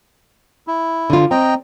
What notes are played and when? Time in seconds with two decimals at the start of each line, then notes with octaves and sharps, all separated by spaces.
0.67 E4
1.10 D3 F4
1.31 C4 D#5 G5 A#5